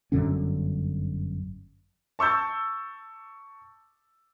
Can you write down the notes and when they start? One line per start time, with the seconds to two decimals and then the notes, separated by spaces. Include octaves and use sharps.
0.12 G1 F#2 D3 C#4
2.19 A5 C#6 E6 G6 A6